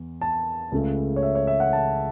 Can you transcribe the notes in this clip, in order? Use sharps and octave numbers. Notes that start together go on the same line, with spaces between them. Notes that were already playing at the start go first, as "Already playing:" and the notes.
Already playing: E2
A5
C#2 C#3 A3
C#5
E5
C#5
E5
F#5
A5